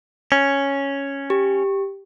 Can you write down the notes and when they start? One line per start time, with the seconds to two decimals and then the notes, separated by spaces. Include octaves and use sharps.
0.32 C#4
1.30 G4